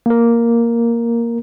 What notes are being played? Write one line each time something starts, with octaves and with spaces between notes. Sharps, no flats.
A#3 A#4